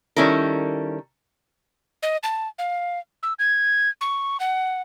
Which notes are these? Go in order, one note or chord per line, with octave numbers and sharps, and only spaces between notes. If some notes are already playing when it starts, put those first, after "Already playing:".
D#3 G3 C#4 E4 A4 A#4
D#5
A5
F5
E6
G#6
C#6
F#5